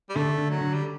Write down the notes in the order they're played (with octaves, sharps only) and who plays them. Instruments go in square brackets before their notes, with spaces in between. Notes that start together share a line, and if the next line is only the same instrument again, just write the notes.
[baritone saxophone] G3
[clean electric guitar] D3 [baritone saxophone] A3
[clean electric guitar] D3
[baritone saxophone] F#3
[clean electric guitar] D3
[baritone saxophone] G3